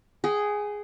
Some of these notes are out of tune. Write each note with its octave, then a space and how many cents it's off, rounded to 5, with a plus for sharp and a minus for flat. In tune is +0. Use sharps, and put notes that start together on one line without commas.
G#4 +0 G5 -45